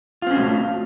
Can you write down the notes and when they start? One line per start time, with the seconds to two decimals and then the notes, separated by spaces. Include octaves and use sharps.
0.22 F4
0.27 C4
0.31 C#4
0.35 F#4
0.39 A3